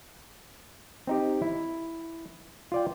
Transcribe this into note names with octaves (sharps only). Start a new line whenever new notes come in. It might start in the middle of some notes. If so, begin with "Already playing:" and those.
C4 D#4 G4
E4
F4 D5 G5